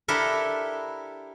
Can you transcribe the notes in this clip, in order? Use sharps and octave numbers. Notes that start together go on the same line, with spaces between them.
D4 E4 G4 A4 A#4